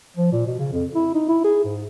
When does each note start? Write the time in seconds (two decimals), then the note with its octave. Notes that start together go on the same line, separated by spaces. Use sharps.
0.17 F3
0.32 A#2
0.47 B2
0.59 C#3
0.72 F2
0.95 E4
1.14 D#4
1.29 E4
1.44 G#4
1.64 G#2